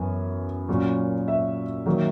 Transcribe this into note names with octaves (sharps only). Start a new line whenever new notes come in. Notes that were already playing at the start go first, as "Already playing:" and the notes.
Already playing: F#2 E3 B3 G#5
A#2 F#3 C#4
E5
D#3 F#3 A#3